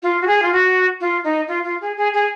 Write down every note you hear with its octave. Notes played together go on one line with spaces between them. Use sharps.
F4
F#4
G#4
F4
F#4
F4
D#4
F4
F4
G#4
G#4
G#4